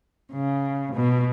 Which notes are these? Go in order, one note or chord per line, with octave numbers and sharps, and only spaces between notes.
C#3
B2